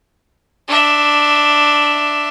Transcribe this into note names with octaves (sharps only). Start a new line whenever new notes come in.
D4 E5